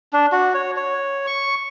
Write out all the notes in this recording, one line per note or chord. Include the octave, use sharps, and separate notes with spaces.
D4
F#4
C#5
C#5
C#6